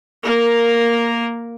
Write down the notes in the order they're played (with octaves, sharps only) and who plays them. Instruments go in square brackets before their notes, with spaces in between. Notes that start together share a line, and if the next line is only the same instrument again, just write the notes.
[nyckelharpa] A#3 A#4